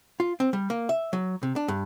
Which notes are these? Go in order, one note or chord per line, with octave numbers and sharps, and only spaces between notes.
F4
C4
G3
A#3
E5
F#3
C3
D4
G2